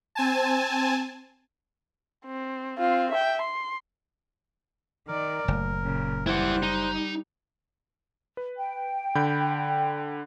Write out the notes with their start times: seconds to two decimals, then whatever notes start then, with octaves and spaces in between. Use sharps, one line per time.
0.15 C4 G#5 A5
2.26 C4
2.79 C4 F4
3.12 E5 G5
3.42 C6
5.08 D#3 A#4 D5
5.48 F#1 A2
5.83 A#2 C#3
6.27 G3 E4 C5 F#5 F#6
6.63 D#4
8.37 B4
8.57 G5
9.15 D3 B5 G6